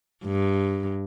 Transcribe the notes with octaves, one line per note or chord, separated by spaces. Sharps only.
G2